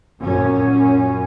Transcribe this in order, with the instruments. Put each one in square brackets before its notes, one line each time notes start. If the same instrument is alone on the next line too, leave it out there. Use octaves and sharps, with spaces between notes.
[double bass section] F#2 A#2 C#4